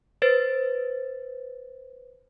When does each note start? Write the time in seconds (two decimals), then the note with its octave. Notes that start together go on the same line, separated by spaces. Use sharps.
0.22 B4 C5 A6